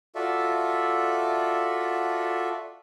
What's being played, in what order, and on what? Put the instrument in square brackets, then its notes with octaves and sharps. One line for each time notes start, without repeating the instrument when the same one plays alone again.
[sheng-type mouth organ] F4 F#4 A4 D5 E5